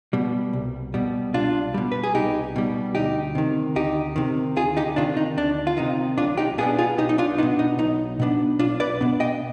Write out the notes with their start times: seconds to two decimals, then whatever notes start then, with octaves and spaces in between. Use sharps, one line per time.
0.13 B2 G3
0.53 C2
0.94 B2 G3
1.34 C2 D4 F4
1.74 B2 G3
1.92 B4
2.03 G#4
2.15 C2 D#4 G4
2.56 B2 G3
2.95 D2 D#4 G4
3.35 C3 D#3
3.76 D2 D#4 G4
4.16 C3 D#3
4.56 D2 F4 G#4
4.77 D#4 G4
4.96 C3 D#3 D4 F4
5.17 D#4
5.37 D2 D4
5.67 F4
5.77 C3 D#3 D#4
6.18 B1 D4 F4
6.37 D#4 G4
6.58 B2 B3 D4 F4 G#4
6.78 F4 G#4
6.98 B1 D#4 G4
7.09 D#4
7.18 D4 F4
7.38 B2 B3 D4 D#4
7.59 D#4
7.78 B1 D#4
8.20 B2 B3 D4
8.59 B1 D4 F4
8.80 B4 D5
9.01 B2 B3 D4
9.20 D#5 G5